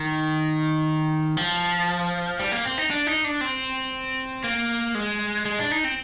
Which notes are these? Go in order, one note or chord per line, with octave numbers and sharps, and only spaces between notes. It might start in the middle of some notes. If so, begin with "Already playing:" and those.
Already playing: D#3
F3
G3
A#3
C4
D#4
D4
D#4
D4
C4
A#3
G#3
G#3
D4
D#4
C4